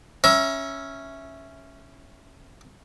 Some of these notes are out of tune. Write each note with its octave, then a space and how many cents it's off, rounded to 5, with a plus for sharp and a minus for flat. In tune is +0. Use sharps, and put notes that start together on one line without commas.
C#4 +0 E5 +0 A#5 +35